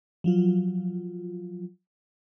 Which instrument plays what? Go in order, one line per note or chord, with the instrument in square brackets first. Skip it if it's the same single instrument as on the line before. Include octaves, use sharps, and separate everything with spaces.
[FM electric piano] F3 F#3 F4